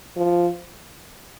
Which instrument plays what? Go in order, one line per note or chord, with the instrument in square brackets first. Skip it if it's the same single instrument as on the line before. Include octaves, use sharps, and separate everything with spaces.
[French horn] F3